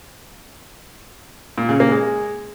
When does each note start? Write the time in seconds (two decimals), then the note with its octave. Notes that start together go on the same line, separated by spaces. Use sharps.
1.58 A#2
1.69 C#3
1.80 A#3
1.91 G#3